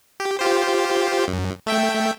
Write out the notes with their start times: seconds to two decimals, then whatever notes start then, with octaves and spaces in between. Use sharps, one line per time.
0.20 G4
0.39 F4 G4 C5
1.28 F#2
1.67 A3 E5 G5